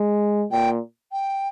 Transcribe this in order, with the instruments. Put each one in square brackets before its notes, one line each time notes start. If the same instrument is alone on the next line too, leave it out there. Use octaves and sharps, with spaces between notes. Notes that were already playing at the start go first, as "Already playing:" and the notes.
Already playing: [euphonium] G#3
[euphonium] A#2 [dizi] G5
[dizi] G5